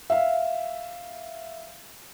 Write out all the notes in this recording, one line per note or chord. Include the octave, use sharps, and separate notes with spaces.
E5 F5